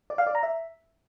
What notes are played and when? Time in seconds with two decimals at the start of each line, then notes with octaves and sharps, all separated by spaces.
0.10 D5
0.18 F5
0.27 D5
0.35 A#5
0.43 E5